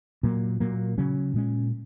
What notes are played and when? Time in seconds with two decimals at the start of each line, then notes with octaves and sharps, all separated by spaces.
0.23 A#2 F#3 A#3
0.60 A#2 F#3 A#3
0.98 C#3 F#3 C#4
1.34 A#2 G#3 C#4